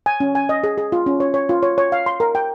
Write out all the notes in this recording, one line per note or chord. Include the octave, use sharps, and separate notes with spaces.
G#5
C#4
G#5
D#5
G#4
G#4
F4
C#4
C#5
C#5
F4
C#5
C#5
F5
C6
A#4
G5